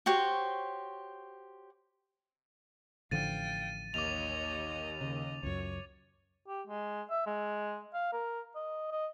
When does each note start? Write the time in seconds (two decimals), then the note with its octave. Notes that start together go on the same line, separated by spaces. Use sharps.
0.06 F#4 G4 C5 C#5
3.11 A1 D3 F3 F5 G5 A6 D#7
3.94 D#2 C#5 D#5 D6 F7
5.01 C#3 D#5
5.43 C#2 F#2 C#5
6.48 G4
6.67 G#3
7.10 E5
7.26 G#3
7.94 F5
8.13 A#4
8.55 D#5
8.91 D#5